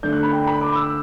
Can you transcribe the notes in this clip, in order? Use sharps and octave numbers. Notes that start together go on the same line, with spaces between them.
D3 A3 D4 G6
F#6
B5
G5
B5
D6
E6